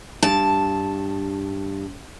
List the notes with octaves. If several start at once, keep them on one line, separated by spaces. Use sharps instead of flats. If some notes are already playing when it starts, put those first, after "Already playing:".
G2 A5